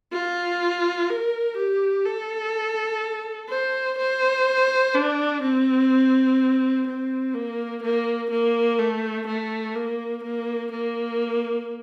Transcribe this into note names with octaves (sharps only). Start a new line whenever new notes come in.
F4
A#4
G4
A4
C5
C5
D4
C4
C4
A#3
A#3
A#3
A3
A3
A#3
A#3
A#3